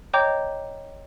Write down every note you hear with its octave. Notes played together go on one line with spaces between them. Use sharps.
C#5 D#5 G5 A#5 D6 G6